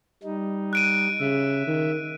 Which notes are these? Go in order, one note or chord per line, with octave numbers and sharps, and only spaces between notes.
G3 D#4
F#6 D7 D#7
C#3 E5
D#3